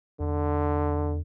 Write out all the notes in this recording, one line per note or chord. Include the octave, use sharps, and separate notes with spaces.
E2 D3